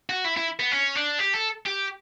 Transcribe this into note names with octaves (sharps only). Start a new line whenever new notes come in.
F#4
E4
E4
B3
C#4
D4
G4
A4
G4